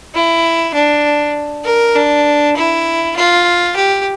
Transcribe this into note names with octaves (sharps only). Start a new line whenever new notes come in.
E4
D4
A#4
D4
E4
F4
G4